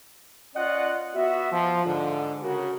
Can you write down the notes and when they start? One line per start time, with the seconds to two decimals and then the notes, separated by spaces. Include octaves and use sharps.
0.55 C#4 F4 D5 D#5 F#5
1.15 B3 F#4 E5
1.52 F3
1.85 G#2 D3
2.42 C#3 F#4 A#4